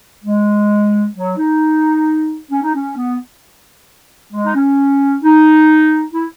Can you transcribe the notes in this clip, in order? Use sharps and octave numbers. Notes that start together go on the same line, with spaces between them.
G#3
F#3
D#4
C#4
D#4
C#4
B3
G#3
D#4
C#4
D#4
E4